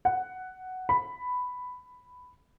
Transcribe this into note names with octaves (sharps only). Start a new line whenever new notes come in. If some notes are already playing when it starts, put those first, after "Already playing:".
F#5
B5